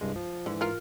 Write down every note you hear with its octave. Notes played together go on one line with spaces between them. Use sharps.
C2 G2 G#3
F3
G#2 D3 E3
F4 A#4